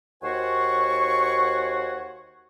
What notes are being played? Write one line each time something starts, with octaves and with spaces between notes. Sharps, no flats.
D#2 F#4 C5 F#5 G#5 C#6